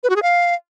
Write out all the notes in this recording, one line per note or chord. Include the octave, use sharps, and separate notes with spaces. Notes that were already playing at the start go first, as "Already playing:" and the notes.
B4
F#4
G#4
F5